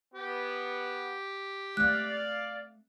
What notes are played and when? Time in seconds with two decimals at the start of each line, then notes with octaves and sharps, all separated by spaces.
0.14 B3 G4
1.77 A3 C4 D5 F5 F#6